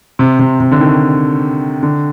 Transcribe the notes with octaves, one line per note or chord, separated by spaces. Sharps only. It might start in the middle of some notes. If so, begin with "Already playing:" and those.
C3
C3
C3
D3
D#3
D3